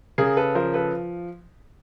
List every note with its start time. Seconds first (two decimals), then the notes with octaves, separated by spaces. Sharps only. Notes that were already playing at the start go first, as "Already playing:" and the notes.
0.18 C#3 G#4 A#4
0.37 A4 B4
0.55 F3 A#4 C5
0.74 A4 B4